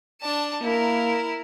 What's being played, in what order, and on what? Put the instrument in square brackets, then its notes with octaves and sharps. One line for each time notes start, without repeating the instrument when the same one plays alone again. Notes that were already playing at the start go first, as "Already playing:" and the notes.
[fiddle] D4 A5
[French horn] A#3 [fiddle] E4 A#4